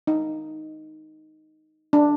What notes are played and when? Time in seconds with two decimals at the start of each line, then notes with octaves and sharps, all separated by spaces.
0.07 D#4
1.93 D4